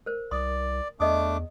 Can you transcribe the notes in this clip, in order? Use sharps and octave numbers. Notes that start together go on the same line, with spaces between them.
A#4 C5
C2 D5 C6 D#6
E2 A3 D4 D#5 D6 D#6